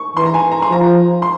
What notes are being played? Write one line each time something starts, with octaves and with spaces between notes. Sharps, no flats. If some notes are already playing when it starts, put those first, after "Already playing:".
Already playing: C#6
E3 C6
A#5
G#5
A#5
C6
F3 A#5
C6